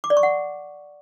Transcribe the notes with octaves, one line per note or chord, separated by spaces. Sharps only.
D6
D5
C#6
F#5